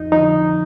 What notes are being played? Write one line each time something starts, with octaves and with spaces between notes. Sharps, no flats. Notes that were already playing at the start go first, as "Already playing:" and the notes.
Already playing: F2 D#4
D3 F3 D#4